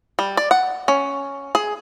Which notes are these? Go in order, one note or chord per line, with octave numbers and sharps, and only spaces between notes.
G3
D5
F#5
C#4
G#4